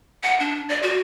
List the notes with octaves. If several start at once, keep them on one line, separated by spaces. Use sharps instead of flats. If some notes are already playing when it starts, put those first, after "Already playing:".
F#5
D4
D5
F#4